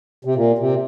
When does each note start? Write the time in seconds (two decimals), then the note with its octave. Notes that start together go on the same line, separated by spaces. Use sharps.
0.25 C3
0.35 A#2
0.58 C3